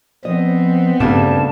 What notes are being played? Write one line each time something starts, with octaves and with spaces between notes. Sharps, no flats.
F3 B3 C4 D#5
D2 G2 C#3 A5